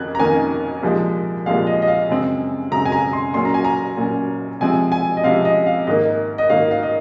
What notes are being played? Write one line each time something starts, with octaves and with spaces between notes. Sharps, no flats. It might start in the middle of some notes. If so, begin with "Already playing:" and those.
Already playing: F2 D#3 C#4 F#6 G#6
A#5
F2 D#3 A#3 C#4 G#5
C2 A#2 F3 G#3
C2 A#2 F3 G#3 F5
D#5
D#5
F5
F#2 C#3 G#3 C4
F#2 C#3 G#3 C4 A#5
G#5
A#5
C6
A#2 F#3 C#4 C6
A#5
G#5
A#5
A#2 F#3 C#4
C3 F3 G#3 C4 G#5
G#5
D#5
C3 F3 G#3 C4 F5
D#5
F5
G#2 D#3 A#3 D#5
D#5
G#2 D#3 A#3 F5
F5
D#5